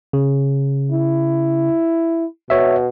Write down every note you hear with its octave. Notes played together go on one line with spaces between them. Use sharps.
C#3
E4
B2 C#5 E5